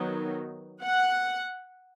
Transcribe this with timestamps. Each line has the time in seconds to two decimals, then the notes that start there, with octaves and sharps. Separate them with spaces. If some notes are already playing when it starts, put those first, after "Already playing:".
Already playing: D#3 F#3 B3 D#4
0.83 F#5